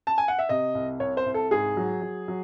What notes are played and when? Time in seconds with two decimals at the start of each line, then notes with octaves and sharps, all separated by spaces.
0.07 A5
0.18 G#5
0.28 F#5
0.39 E5
0.49 C3 D#5
0.75 C2
1.00 C2 C#5
1.17 C5
1.26 C2
1.34 A4
1.51 G#2 G#4
1.77 F#3
2.02 F#3
2.28 F#3